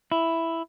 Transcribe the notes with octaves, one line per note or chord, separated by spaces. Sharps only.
E4